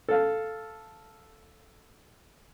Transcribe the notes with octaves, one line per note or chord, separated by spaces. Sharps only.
A4 F5